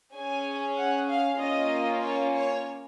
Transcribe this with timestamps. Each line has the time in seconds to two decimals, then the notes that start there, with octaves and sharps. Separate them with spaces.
0.15 C#4 G#4 G#5
0.78 F#5
1.09 F5
1.40 A#3 C#4 F4 D#5
2.03 C#5
2.34 C#5